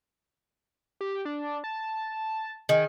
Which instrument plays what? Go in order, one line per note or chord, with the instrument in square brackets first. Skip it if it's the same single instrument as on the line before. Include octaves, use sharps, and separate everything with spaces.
[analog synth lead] G4
D4
A5
[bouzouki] D#3 [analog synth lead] G#4